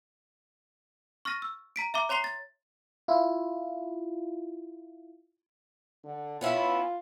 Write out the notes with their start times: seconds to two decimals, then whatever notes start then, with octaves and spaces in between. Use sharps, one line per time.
1.25 C#6 F6 A6 A#6 D#7
1.42 E6
1.76 A#5 B6 D7
1.94 E5 A#5 D6
2.09 C#5 A#5 C6 C7 G7
2.24 A6
3.08 E4 F4
6.04 D3
6.41 B3 C#4 E4 F4